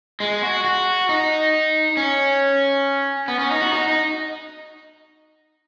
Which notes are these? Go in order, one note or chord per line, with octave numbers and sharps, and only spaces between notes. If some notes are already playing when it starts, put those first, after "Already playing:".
G#3
F#4
F#4
D#4
C#4
B3
C#4
D#4
F#4
D#4
D#4